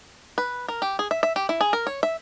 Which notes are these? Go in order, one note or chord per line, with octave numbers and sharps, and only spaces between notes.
B4
A#4
G4
G#4
E5
E5
G4
E4
G#4
A#4
C#5
E5